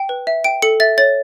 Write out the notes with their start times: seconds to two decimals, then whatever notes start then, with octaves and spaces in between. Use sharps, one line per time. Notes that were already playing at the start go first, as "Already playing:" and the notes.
Already playing: G5
0.09 B4
0.27 E5
0.44 G5 D7
0.62 A4 C#7
0.80 E5 A6
0.98 C#5 A6